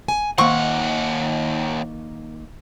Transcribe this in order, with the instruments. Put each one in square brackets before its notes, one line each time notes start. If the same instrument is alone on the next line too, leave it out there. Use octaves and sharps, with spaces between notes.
[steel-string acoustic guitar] G#5
[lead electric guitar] D#2 F#5 [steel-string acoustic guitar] D#3 A#3 [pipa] C4 C#6